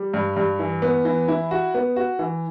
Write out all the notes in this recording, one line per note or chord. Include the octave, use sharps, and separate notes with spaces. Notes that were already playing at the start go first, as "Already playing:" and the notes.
Already playing: G3
G2
G2
E3
B3
E3
E4
F#4
B3
F#4
E3